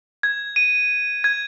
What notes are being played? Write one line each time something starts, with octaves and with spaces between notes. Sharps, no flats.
G#6
D#7
G#6